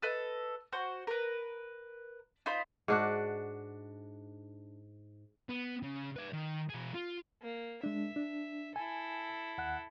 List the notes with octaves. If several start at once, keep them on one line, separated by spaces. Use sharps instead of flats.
A4 B4 D#5
F#4 C5
A#4 B4
D#4 F4 C5 B5
G#2 D4 F#4
B3
C#3
B4 D5
D#3
B2 G#4
F4
A#3
G#3 D4 E5
D4
E4 A4 G#5
D#2 F#5 F#6